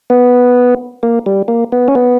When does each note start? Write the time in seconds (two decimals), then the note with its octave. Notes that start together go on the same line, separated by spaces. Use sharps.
0.10 B3
1.03 A#3
1.26 G3
1.48 A#3
1.72 B3
1.88 C#4
1.95 B3